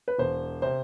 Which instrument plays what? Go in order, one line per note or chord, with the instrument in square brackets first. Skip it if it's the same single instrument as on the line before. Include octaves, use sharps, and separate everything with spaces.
[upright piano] B4
E1 C5
C3 C5